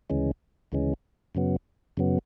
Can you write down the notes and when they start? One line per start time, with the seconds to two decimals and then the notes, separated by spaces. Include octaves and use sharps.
0.10 D2 C#3 E3 G#3 C#4
0.72 D2 C#3 E3 G#3 C#4
1.35 F#2 C#3 F#3 B3
1.97 F#2 C#3 F#3 B3